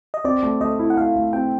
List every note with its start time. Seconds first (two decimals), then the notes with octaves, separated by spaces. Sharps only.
0.14 D#5
0.24 C4 D5
0.43 A3
0.61 A3 D#5
0.79 E4
0.90 F#5
0.97 A3 F5
1.16 A3
1.33 C4 G5